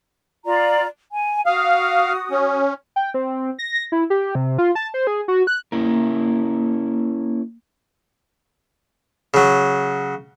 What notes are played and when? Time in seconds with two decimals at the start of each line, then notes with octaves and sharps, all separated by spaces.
0.45 F4 D5 A#5
1.13 G#5
1.46 F#4 F5 D#6
2.31 C#4
2.96 G5
3.14 C4
3.59 A#6
3.92 E4
4.10 G4
4.35 C3
4.58 F4
4.75 A5
4.94 C5
5.07 G#4
5.28 F#4
5.47 F#6
5.72 A#3 C#4 E4 A#4
9.34 C#3 F#3